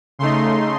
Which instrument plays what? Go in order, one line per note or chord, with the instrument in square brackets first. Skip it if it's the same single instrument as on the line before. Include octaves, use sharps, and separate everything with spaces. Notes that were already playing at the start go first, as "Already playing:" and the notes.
[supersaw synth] C#3 A3 D#4 C6